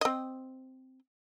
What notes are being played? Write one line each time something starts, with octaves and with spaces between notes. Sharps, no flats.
C4 D#5